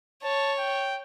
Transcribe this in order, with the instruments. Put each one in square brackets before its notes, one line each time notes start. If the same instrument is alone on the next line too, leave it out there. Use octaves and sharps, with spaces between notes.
[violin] C#5 [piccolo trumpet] A5
[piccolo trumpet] G5